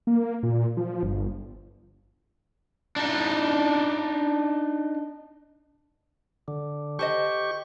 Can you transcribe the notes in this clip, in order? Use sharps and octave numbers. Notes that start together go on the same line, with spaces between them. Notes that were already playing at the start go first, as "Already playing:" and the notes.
A#3
A#2
F3
G1
D4 D#4
D3
G4 A4 C5 D#5 C#6